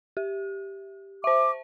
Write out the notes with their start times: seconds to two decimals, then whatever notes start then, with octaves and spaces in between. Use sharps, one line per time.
0.17 G4
1.24 C5 E5 D6